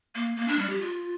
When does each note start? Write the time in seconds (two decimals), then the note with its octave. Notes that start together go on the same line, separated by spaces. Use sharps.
0.15 A#3
0.37 A#3
0.48 D4
0.59 G3
0.70 G4
0.80 F4